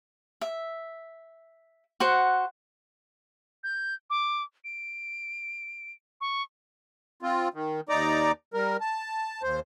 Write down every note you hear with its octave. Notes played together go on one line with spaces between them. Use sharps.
E5
F#4 C5 F#5
G6
D6
D7
C#6
C4 F4
D#3
D#2 D#4 D5 A#5 D6
G3 A#4
A5
D#2 C5